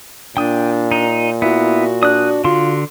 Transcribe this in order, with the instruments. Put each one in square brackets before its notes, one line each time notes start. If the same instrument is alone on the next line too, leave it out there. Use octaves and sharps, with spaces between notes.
[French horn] A#2 [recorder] D4 [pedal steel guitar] G5 D#6
[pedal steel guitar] D#4
[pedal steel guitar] B3 [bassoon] E4 [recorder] F#4
[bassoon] D4 [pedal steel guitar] D#6 F#6
[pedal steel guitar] D3 C6 [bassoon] F4